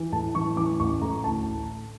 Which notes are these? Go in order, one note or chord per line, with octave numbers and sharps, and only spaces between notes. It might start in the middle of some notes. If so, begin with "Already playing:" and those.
Already playing: E3
A2 A5
E3 C#6
E3 D6
A1 C#6
A2 A#5
D2 A5